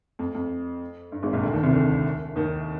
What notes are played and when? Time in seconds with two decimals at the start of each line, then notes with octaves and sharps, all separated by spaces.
0.19 F2
0.34 F2
1.12 G2
1.22 G#1 G#2
1.33 A#1 A#2
1.43 D2 D3
1.53 D#2 D#3
1.63 C2 C3
1.73 D2 D3
2.36 D#2 D#3